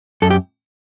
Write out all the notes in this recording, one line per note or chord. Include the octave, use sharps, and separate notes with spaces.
F#2 A4
G4